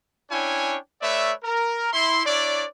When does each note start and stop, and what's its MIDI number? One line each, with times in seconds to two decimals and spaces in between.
0.31 0.77 61
0.31 0.77 62
0.31 0.77 64
0.31 0.77 73
0.31 0.77 79
0.31 0.77 80
1.02 1.33 57
1.02 1.33 71
1.02 1.33 73
1.02 1.33 74
1.02 1.33 76
1.43 1.92 70
1.93 2.22 64
1.93 2.22 84
2.26 2.65 62
2.26 2.65 64
2.26 2.65 73
2.26 2.65 74